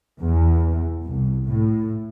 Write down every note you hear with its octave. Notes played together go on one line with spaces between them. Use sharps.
E2
C2
A2